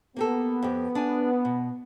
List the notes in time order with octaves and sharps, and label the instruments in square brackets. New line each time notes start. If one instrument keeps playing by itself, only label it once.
[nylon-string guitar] A#3 G4 A4 [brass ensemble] B3
[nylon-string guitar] F2 G4
D4 G#5
B2